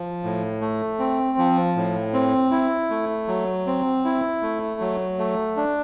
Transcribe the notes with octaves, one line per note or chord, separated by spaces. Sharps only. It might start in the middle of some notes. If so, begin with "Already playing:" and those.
Already playing: F3
A2
A3
C4
F3
A2
C4
E4
A3
F#3
C4
E4
A3
F#3
A3
D4